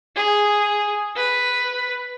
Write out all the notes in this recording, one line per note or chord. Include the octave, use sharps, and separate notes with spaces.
G#4
B4